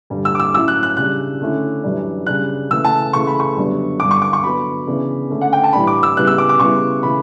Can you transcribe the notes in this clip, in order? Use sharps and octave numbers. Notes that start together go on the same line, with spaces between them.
G2 D3 G3
E6
D6
E6
A2 F#3 C#4 E4 E6
F#6
F#6
C#3 G3 D4 F#6
D3 A3 C#4 E4
F#2 E3 G3 D4
C#3 G3 D4 F#6
C#3 E3 A3 E6
A5
C#3 E3 A3 C#6
B5
C#6
F#2 D3 G3 B3 D4
G2 D3 G3 D6
C#6
D6
C#6
D3 F#3 B3 B5
C#3 E3 B3 D4
D3 A3 C#4
F#5
G5
A5
A2 E3 G3 D4 B5
D6
E6
C#3 G3 B3 E4 F#6
E6
D6
D6
C#3 G3 B3 E4 C#6
C#3 E3 A3 B5